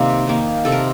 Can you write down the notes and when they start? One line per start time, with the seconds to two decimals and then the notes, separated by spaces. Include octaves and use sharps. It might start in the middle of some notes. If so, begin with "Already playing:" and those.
Already playing: C3 D#3 A#3 D#4
0.27 D#3 A#3 D#4
0.65 C3 A4
0.72 A#4